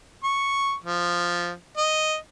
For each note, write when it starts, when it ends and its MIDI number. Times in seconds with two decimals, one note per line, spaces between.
0.24 0.73 85
0.84 1.52 53
1.77 2.16 75